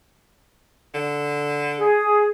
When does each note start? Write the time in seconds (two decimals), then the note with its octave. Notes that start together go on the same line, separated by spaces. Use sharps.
0.94 D3
1.79 G#4